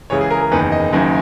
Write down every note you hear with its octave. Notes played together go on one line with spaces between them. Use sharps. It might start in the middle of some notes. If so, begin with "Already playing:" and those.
C#2 C#3 E3 C#5
G#4
A#4
A#4
F#1 E2 D#3 B4
D#5
F#1 F#2 D#3